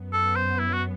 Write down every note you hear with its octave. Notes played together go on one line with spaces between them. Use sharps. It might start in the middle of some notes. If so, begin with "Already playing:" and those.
Already playing: F#2 F#3 B3
A4
C5
E4
F#4